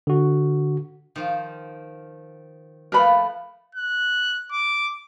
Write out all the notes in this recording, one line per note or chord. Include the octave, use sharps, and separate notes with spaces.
D3 F#4
D#3 F3 C5
F3 A3 A#3 A#4 B4 B5
F#6
D6